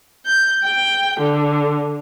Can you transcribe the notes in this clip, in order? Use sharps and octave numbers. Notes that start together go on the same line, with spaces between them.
G6
G5
D3